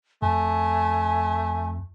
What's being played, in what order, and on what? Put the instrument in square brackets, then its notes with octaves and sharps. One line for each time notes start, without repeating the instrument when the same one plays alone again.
[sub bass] F2 [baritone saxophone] A3 [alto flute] G#5